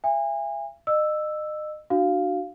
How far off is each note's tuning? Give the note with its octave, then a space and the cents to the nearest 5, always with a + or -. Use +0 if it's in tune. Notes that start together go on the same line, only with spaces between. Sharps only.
E5 +40 G#5 -35
D#5 -30 E6 +0
D4 +30 F#4 +0 F5 +0